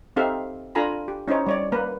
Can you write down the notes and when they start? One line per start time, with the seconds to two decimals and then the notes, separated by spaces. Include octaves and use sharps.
0.16 C4 D#4 G4 A4 E5 F5
0.75 D4 F4 A4 G#5 A#5 B5
1.08 G4
1.28 C#4 D#4 E4 C5 C#5
1.47 G3 C#5 D5
1.72 A#3 B4